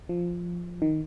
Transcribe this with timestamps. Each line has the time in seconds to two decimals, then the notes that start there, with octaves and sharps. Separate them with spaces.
0.09 F3
0.82 D#3